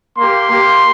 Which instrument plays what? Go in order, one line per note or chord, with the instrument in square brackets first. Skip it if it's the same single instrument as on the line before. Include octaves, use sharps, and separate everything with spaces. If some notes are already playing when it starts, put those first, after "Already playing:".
[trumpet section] A#3 G4 C6
A#3 G4